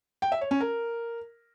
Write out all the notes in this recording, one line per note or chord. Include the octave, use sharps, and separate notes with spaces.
G5
E5
C#5
C#4
A#4